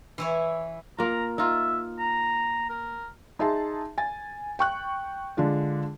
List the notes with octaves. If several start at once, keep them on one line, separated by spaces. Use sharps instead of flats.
E3 E4 C#5
A#3 F4 A#5
D#4 F4 E5
A#5
A#4
D#4 G#4 E5 A5 C6
G#5 A6
G5 C#6 F#6
D3 G#3 D4 F4